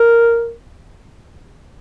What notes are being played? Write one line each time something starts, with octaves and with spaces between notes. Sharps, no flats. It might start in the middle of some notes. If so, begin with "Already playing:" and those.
Already playing: A#4